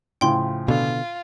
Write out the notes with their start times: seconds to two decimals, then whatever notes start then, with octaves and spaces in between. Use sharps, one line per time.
0.21 A2 C#3 F3 G5 C6
0.68 B2 D3 F4